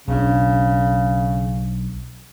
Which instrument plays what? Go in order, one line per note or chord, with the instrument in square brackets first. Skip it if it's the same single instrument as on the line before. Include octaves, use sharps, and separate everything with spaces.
[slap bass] B1 F#3 D4 [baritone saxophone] C#3